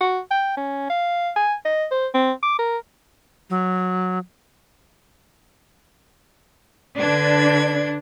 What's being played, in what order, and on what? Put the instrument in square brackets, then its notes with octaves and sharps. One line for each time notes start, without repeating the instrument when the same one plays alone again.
[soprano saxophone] F#4
G5
C#4
F5
G#5
D#5
C5
C4
D6
A#4
[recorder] F#3
[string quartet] D3 B4 G#6 [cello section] D4